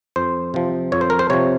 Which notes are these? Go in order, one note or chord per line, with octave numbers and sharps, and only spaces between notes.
F2 C5
C3 F3
F2 C#5
C5
A#4
C5
C3 F3 C#5